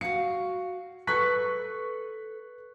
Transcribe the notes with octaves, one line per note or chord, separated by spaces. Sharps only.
F#4 F5 C#7
A4 B4 C#6 F#6 B6